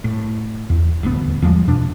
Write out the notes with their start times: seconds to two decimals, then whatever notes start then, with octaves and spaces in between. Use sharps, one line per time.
0.04 A2
0.70 E2
1.03 D#1 A1 D2 B3
1.42 E2 F3 G3 G#3
1.68 F2 B2 D4